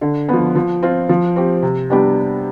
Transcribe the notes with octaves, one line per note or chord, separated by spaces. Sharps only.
D3
F3 B3
F3
C4 F4
F3
C4 G4
C3
G3 B3 D4 G4